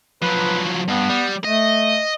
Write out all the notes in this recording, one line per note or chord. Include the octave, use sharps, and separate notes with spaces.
F3 F#3 B4
G2 B3
G3
A3 D#5